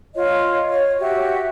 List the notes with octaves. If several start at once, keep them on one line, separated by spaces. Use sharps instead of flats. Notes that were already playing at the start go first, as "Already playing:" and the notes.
F4 C#5 D#5
C#5
F#4 G4 E5